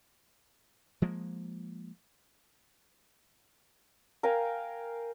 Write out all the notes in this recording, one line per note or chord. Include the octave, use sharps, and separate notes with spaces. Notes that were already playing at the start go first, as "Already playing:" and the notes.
F3 G#3 A#3
A#4 F5 G5 G#5